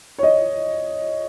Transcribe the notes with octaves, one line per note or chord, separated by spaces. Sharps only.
C#5
D#5